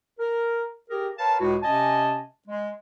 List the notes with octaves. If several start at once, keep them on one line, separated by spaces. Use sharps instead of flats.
A#4
G4 G#4 A#4
A#4 B4 C#5 F5 A5
C#2 A2 G#3 E4 F#4
C3 C#4 D#5 G#5 A5
G#3